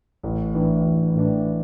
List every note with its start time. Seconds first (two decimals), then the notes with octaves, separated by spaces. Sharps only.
0.23 A1
0.54 A2 E3 D4
0.84 A1
1.15 A2 E3 D4